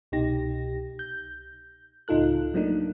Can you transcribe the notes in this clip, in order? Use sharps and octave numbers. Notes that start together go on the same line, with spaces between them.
C2 B2 D#4 G4 A#6
G6
C#2 A2 D#4 F4 A4 F#6
F#3 A3 A#3 D4 D#4